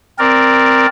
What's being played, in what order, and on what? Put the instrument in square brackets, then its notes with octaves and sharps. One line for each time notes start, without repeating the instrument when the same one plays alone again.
[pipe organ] C4 A#4 D5